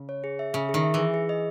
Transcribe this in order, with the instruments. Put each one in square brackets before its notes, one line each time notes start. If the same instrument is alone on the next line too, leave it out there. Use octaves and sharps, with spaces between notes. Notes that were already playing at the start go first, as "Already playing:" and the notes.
Already playing: [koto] C#3
[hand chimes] C#5
G#4
E5
[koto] C#3 [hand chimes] E5
[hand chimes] G#4
[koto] D#3
[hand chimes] E5
[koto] E3
[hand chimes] G#4
G#4
D#5